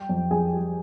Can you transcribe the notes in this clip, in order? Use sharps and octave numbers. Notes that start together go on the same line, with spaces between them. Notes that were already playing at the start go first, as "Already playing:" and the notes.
Already playing: G3 G4 G5
F2
F2 G#4 G#5
G3